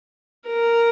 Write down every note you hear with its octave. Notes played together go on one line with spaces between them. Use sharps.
A#4